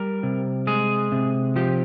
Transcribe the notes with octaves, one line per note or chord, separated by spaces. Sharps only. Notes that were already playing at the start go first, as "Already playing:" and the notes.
Already playing: G3 A#4
C3
G#3 G#4
C3
F3 G4